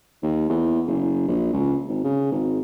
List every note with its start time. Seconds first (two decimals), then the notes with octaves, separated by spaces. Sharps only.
0.23 D#2
0.50 E2
0.87 F#1
1.28 A#1
1.53 C#2
1.88 G#1
2.04 C#3
2.32 G#1